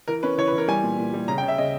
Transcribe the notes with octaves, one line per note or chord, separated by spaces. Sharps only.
E3 A#4
C#4 B4
E3 C#5
B4
E3
A#4
G3 G#5
A#2
A#2
G3
C#3 A#5
G5
C#3
E5
C#3 D#5